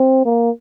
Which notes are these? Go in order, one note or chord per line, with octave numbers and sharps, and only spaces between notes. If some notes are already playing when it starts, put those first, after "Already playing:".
Already playing: C4
A#3